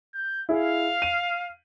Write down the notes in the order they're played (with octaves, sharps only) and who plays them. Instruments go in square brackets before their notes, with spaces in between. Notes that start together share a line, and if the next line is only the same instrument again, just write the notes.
[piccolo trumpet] G6
[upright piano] E4 G#4 [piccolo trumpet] F5
[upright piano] D#7